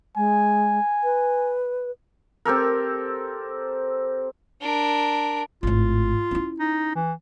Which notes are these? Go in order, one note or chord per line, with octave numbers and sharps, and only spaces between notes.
G#3 G#5
B4
C4 G4 A4 A#4
D4 A#4
G#1 A2 F4
C#4 E4
D#4
E3